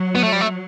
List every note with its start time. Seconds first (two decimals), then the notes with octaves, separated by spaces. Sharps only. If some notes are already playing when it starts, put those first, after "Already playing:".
Already playing: F#3
0.15 B3
0.23 A3
0.32 G3
0.41 A3